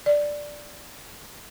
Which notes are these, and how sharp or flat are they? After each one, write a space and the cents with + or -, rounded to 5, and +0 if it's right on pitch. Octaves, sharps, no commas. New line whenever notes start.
D5 +0